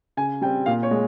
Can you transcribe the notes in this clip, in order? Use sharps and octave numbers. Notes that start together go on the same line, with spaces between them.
C#3 G#5
G3 C4 G5
A#2 F5
C#5
G#3